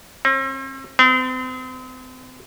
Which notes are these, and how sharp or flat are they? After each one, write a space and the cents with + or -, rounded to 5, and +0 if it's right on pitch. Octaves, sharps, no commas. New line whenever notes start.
C4 +40
C4 -40